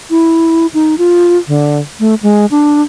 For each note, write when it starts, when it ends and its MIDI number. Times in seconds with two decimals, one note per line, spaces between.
0.10 0.67 64
0.74 0.95 63
0.98 1.38 65
1.48 1.79 50
2.00 2.15 57
2.23 2.46 56
2.51 2.81 62